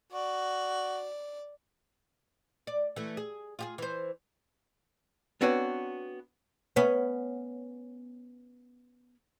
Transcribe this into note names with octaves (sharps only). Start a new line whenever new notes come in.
F#4 D5
D5
E3 A3
G#4
F4 G4 G#4
E3 C5
B3 C4 D4 F#4 B4 C#5
B3 C#4